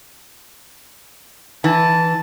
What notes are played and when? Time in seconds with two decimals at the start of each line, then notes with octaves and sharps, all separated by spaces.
1.64 E3 A5